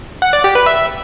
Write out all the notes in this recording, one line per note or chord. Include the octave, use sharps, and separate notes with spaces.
F#5
D5
G4
B4
E5